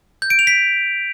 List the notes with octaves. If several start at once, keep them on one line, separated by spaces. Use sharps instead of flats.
G6
D7
F7
B6